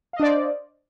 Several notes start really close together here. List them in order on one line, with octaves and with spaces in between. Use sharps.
F5 D#5 D4 D5 C5